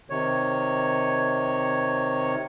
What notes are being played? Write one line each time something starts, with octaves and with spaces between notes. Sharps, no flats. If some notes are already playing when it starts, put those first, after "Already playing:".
C3 D#3 C#5